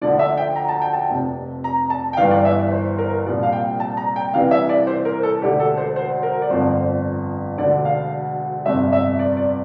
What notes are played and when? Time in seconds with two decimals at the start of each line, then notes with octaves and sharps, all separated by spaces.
0.01 D2 D3 F3 D5
0.19 E5
0.37 G5
0.56 A#5
0.69 A5
0.81 G5
0.93 A5
1.10 F1 F2 C3
1.64 A#5
1.90 A5
2.13 G5
2.17 G1 G2 E3 F5
2.31 D5
2.45 E5
2.72 C5
2.98 A#4
3.25 C2 A#2 F3 D5
3.43 F5
3.52 G5
3.80 A5
3.97 A#5
4.16 G5
4.34 C2 C3 E3 F5
4.51 E5
4.69 D5
4.87 C5
5.05 A#4
5.23 A4
5.41 E1 D2 D3 G4
5.60 A4
5.77 C5
5.96 C5
6.23 A#4
6.42 D5
6.50 G1 F2 D3 F3 C5
7.58 E1 D2 D3 D5
7.85 F5
8.66 G1 F2 C3 E5
8.92 E5
9.19 D5
9.37 D5